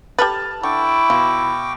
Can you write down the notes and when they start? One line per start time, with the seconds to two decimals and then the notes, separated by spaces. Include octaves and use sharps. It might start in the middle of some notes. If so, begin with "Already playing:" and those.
0.19 G4 A4 B4 A5 F6 A6
0.63 D3 E4 G5 C#6 D6
1.10 B2 F4